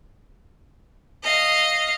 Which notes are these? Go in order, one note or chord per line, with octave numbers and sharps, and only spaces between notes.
D#5 F5